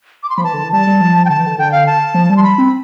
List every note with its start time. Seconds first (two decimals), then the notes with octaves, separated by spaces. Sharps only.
0.23 D6
0.30 C6
0.37 F3 B5
0.44 E3 A5
0.54 D3
0.64 E3
0.73 G3 A5
0.87 G3
1.01 F3
1.25 G5
1.30 D3 A5
1.38 E3
1.47 D3
1.58 D3 G5
1.72 F5
1.87 A5
2.14 F3
2.30 G3
2.37 C6
2.43 B5
2.58 C4